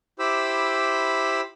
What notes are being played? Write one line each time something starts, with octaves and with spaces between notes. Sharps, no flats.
E4 G4 C5 B5 D6 E6